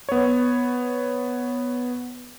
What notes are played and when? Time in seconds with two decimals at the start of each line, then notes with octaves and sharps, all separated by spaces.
0.09 B3 C#5